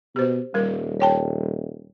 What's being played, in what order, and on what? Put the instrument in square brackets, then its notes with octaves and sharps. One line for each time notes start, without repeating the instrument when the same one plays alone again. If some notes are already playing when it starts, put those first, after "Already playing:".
[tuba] B2 [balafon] G4 C5
[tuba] D#1 [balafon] G3 A#4
[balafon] C#5 G5 A5